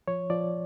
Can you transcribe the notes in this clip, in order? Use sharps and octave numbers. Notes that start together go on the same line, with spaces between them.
F3 C#5
F3 D5